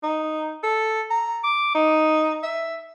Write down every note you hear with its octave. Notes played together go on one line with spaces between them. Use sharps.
D#4
A4
A#5
D6
D#4
E5